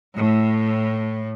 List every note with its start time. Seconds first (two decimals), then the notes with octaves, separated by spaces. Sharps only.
0.15 A2